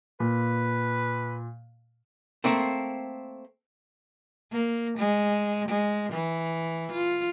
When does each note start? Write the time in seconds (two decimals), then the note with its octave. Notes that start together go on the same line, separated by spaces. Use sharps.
0.20 A#2 B4
2.44 A3 A#3 C4
4.52 A#3
4.98 G#3
5.69 G#3
6.13 E3
6.92 F4